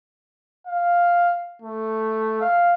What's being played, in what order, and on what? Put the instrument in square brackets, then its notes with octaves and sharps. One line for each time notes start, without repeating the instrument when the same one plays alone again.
[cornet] F5
A3
F5